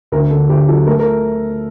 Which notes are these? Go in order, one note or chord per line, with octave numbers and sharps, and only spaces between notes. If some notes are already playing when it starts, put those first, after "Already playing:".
D2 A#4
D3 A4
D2 G4
F#3 A4
A3 A#4
A4
A#4